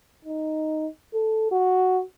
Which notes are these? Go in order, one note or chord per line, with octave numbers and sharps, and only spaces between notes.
D#4
A4
F#4